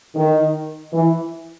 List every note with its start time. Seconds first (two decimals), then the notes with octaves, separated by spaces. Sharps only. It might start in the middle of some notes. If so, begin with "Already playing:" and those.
0.16 D#3
0.93 E3